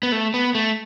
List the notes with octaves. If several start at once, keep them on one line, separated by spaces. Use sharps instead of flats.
B3
A3
B3
A3